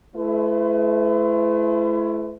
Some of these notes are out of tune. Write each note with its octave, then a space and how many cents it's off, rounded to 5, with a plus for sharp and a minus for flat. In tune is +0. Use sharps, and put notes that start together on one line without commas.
A3 -35 E4 +30 B4 +45